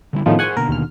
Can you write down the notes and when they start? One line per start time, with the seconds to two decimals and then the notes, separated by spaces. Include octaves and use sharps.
0.13 D3 G3 E4
0.26 A2 D#3 F3 B3 C#4 G#4
0.39 G#4 A#4 C5 F#5 G#5 C#6
0.57 B2 D3 A#3 A#4
0.69 D#2 F6